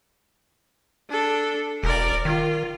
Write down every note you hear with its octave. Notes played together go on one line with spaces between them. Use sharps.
D4 A4
E1 A#4 D5
D#3 F4